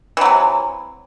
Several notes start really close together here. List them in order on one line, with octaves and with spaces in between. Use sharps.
E3 F#3 C3